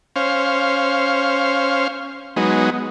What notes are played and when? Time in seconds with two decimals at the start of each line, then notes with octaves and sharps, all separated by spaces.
0.16 C#4 C5 F5
2.36 F#3 G#3 B3 D#4